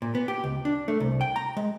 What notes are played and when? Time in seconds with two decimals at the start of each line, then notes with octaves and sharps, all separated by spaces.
0.02 A#2
0.15 B3
0.28 G4
0.44 C#2
0.65 D4
0.88 A3
1.00 C2
1.21 G5
1.36 A#5
1.57 G#3